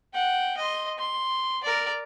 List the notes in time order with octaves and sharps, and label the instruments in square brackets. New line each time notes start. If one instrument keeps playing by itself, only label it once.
[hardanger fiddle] F#5 G5
D#5 C6
C6
A#4 D5